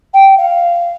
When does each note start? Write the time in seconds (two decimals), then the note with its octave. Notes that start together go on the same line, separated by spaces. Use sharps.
0.13 G5
0.37 F5